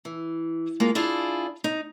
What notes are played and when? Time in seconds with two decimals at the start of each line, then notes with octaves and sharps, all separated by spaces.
0.05 E3
0.80 G#3 A#3 F4
0.95 D4 E4 F4 G#4
1.64 D#4